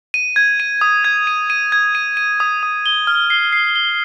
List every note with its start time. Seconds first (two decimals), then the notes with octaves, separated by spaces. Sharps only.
0.14 D#7
0.36 G#6
0.60 D#7
0.81 D#6
1.04 G#6
1.27 D#7
1.50 D#7
1.72 G#6
1.95 D#7
2.17 D#7
2.40 D#6
2.63 D#6
2.86 G7
3.07 F6
3.30 C7
3.53 C7
3.76 G7